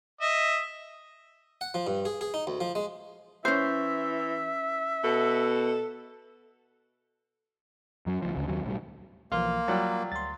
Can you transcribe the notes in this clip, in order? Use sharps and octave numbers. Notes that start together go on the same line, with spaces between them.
D#5 E5
F#5
F3
G2
G#4
G#4
D#4
D2
F3
G#3
E3 C#4 C5 E5
B2 A4
F#2 F#3
D2 F3
D2 C#3
D#2 F#3
B1 A2 G3
B1 E3 F3 A#3 F5 C6 F6
F#3 G3 F4
D2 C6 A6